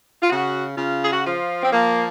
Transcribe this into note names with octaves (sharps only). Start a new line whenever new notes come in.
F4
C#3 F#4
C#3 F4
G#4
F#4
F3 F4
C4
F3 A#3